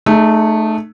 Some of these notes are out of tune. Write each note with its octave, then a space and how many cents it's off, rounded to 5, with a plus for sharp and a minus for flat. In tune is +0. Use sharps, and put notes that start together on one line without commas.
A3 -5 D#4 -35 G#4 +15